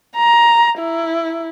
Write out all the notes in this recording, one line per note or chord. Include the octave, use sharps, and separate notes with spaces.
A#5
E4